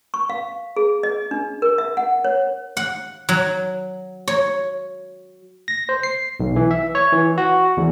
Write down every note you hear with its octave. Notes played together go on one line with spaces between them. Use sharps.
C#6
F5
G#4
D#5
D4
A#4
E5
F#5
C#5
F#5
F#3
C#5
A#6
C5
C7
B1
E3
E5
C#5
E3
F#4
E2